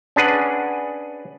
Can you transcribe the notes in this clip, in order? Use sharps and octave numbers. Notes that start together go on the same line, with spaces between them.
C#4 D4 G#4 B4 F#5